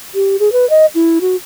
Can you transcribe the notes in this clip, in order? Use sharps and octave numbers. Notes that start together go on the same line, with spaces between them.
G4
G#4
B4
D#5
E4
F#4